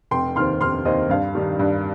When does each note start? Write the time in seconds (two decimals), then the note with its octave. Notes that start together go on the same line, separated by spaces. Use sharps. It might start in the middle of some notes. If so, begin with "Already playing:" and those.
0.11 F1 G5 C6
0.36 D#2 D#3 C4 C6 F6
0.61 F1 C6 F6
0.85 D#2 D#3 C4 D#5
1.10 G2 F5
1.35 D#3 G3 D#4
1.59 G2